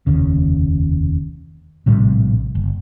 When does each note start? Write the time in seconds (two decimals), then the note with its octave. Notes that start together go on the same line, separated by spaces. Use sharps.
0.07 F1 D#2 C#3
1.86 A#1 A2 C3 G3
2.55 F#1